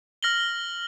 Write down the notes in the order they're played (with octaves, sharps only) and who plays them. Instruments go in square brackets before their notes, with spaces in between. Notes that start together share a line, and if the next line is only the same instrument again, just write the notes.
[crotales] F6 A#6 F#7 G7